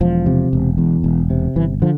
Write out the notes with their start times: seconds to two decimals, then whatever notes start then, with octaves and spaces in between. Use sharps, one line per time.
0.01 E1 F3
0.26 C3
0.53 E1
0.78 E2
1.04 E1
1.30 C3
1.56 G1 E3
1.82 D3 F3